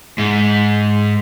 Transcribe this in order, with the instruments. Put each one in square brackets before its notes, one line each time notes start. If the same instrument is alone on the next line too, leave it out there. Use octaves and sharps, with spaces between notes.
[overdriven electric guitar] G#2